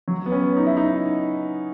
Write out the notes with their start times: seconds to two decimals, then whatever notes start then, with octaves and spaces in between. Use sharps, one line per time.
0.08 F#3
0.26 B3
0.32 C#4
0.57 D#4
0.67 E4
0.77 D#4